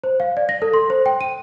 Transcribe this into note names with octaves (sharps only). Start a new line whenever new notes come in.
C5
F5
D5
A#6
A4
C6
C5
G5
D#7